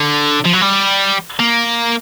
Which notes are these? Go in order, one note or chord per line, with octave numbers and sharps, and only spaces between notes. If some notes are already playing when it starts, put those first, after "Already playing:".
Already playing: D3
F3
F#3
G3
A#3